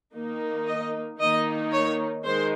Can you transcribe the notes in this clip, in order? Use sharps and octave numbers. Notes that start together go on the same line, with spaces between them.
D#3 A#3 D#4
D#5
D#3 A#3 D#4 D#5
C#5
D#3 G#3 C5